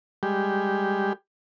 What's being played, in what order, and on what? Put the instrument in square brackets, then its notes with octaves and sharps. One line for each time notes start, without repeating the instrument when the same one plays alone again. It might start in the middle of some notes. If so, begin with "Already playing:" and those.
[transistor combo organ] G3 G#3 G4